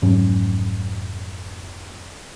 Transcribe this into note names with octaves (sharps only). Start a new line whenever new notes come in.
F1 G#2 F#3 C#4